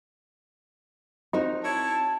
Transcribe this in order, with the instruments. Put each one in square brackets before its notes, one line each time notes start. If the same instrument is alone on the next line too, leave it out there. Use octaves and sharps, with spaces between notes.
[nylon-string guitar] C4 F#4 A#4 [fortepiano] D#4
[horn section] E4 C#5 [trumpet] A5